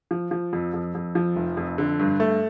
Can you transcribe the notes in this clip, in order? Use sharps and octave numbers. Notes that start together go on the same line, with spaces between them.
F3
F3
F2
F2
F2
F3
F1
F2
D3
G2
A3